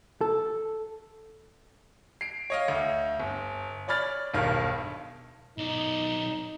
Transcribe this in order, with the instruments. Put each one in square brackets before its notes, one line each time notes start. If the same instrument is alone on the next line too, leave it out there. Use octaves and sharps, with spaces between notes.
[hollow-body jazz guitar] A4
[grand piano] C7 D7
C#5 D#5 F5
D2
G1
C#5 D5 B5 F6 A6
E1 B1 G2 D#3 F5 F6
[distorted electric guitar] B1 D5 [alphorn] D#4